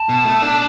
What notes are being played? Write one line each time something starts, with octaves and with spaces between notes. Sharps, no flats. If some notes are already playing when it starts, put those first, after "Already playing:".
Already playing: A5
B2
A3
D4